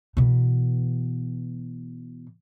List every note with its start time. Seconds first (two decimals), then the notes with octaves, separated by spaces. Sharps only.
0.17 B2 E3